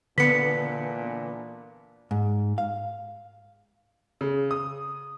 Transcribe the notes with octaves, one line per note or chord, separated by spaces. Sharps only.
A#2 D3 E3 B3 D4 B4 B6 C#7
G#2
F5
C#3
D#6